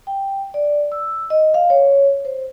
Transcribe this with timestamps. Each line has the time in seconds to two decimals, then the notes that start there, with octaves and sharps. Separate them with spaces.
0.07 G5
0.54 D5
0.92 E6
1.30 D#5
1.54 F5
1.70 C#5
2.25 C5